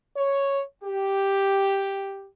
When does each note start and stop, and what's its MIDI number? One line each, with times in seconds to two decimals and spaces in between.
0.17 0.62 73
0.84 2.27 67